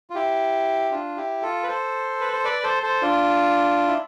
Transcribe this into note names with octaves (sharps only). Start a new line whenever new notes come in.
F4
E4 G4
D4 F4
E4 G4
F4 A4
B4
A4 C5
B4
C5
B4 D5
A4 C5
A4 C5
D4 F4
E4